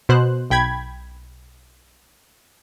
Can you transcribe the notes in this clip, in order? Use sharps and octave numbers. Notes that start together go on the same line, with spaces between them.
B2 C5 F#6
B1 G5 B5 G#6